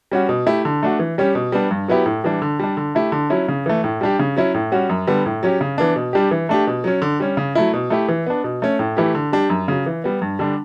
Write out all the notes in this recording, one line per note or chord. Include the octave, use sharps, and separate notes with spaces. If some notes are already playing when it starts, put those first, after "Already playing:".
G3 C#4 F#4
B2
A3 E4 G4
D3
A3 D4 F#4
E3
G3 C#4 G4
B2
G3 B3 D4
G2
F#3 B3 E4 G4
A2
E3 G3 D4
D3
G3 D4
D3
A3 E4 G4
D3
F#3 C#4 E4
C#3
E3 A3
A2
G3 D4 G4
C#3
F#3 C#4 E4
A2
G3 C#4 F#4
F#2
D3 G3 B3
A2
F#3 C#4 G4
C#3
E3 B3 D4
B2
G3 D4 G4
E3
A3 D4 G4
B2
F#3 C#4
D3
G3 C#4
C#3
F#3 A3 E4
B2
A3 E4 G4
E3
B3 D4
B2
A3 C#4
A2
E3 A3 E4 G4
D3
G3 D4 G4
F#2
C#3 F#3
E3
G3 B3
G2
D3 G3 D4